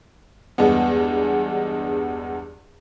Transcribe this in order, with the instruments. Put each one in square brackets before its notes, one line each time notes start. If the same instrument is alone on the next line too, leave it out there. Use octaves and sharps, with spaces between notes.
[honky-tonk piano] E2 G2 G#3 B3